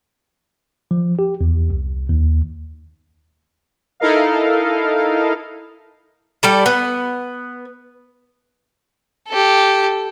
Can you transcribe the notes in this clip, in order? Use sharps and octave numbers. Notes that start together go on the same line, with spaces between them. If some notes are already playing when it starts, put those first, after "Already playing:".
F3
G4
E2
C2
D#2
D#4 E4 A4 A#4 D#5 F5
G3 A4 D5
B3
G4 A4